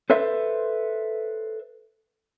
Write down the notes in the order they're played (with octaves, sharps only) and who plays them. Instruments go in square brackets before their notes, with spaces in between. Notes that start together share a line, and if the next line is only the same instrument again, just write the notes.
[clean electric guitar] A4 B4 C5 E5